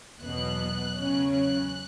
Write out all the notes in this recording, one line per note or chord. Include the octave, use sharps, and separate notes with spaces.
E2 B2 F#3 B3 F#6
E2 C#3 F#3 C#4
F#6